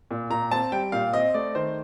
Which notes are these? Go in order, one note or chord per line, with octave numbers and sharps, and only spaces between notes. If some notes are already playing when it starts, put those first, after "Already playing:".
A#2
A#2 A#5
C4 A5
G3 G5
A#2 F5
C4 D#5
A3 D5
D#3 C5